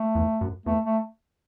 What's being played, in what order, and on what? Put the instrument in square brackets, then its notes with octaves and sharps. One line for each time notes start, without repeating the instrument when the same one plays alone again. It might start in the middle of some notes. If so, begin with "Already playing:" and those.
Already playing: [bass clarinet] A3
[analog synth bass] E2
F#2
[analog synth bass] E2 [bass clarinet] A3
[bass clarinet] A3